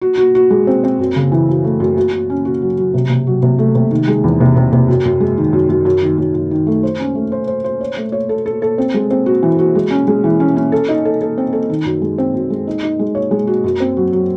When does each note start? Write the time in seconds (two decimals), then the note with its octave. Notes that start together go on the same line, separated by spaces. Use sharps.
0.02 F#4
0.18 F#4
0.35 F#4
0.50 G#3
0.67 C4
0.84 C4
0.99 F#2
1.16 C#3
1.32 E3
1.49 F#2
1.65 A3
1.80 F#2
1.97 F#4
2.12 F#4
2.30 C#4
2.45 F#4
2.62 F#3
2.78 F#3
2.94 C3
3.10 C3
3.27 F#3
3.43 C3
3.59 A3
3.75 C3
3.91 D#3
4.08 G#3
4.24 E2
4.40 C3
4.56 C3
4.73 C3
4.88 F#2
5.05 F#2
5.20 G#3
5.38 D#3
5.53 F#2
5.69 F#2
5.85 F#2
6.03 D#3
6.18 F#2
6.34 F#2
6.51 D#3
6.67 A3
6.83 C5
7.00 C#4
7.15 A3
7.32 C5
7.47 C5
7.64 C5
7.81 C#5
7.97 A3
8.12 C#5
8.29 A4
8.46 A4
8.62 A4
8.78 C4
8.94 G#3
9.11 C4
9.26 F#4
9.43 E3
9.59 F#4
9.75 G#3
9.91 C#4
10.08 G#3
10.24 E3
10.40 C#4
10.56 C#4
10.72 A4
10.88 D#4
11.05 A4
11.21 A4
11.38 C4
11.53 A4
11.70 D#3
11.85 F#2
12.02 G#3
12.18 C4
12.34 F#2
12.50 G#3
12.67 D#4
12.83 D#4
12.99 G#3
13.15 C#5
13.31 G#3
13.47 F#4
13.64 F#2
13.80 C4
13.97 F#3
14.12 F#3